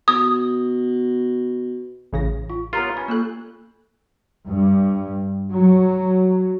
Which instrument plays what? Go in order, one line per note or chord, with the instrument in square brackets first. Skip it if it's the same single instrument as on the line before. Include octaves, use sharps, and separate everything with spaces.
[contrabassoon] B2 [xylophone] D#6
[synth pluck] A1 C#3 A#6
[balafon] F4
[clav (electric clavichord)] B3 F4 [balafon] G4 A#5 [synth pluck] A#4 C#5
[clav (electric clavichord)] C#4 [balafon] B5
[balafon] A#3 F4 A4 [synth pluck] E6 F#6
[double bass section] G2
F#3